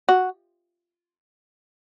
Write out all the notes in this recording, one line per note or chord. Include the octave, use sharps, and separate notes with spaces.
F#4